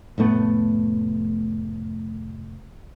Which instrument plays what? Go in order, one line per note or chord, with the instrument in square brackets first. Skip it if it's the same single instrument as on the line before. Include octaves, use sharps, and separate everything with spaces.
[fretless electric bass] F1 A2 A3 B3